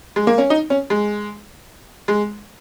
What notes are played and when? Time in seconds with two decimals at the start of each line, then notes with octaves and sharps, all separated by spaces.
0.16 G#3
0.27 A#3
0.38 C#4
0.50 D#4
0.70 C#4
0.90 G#3
2.08 G#3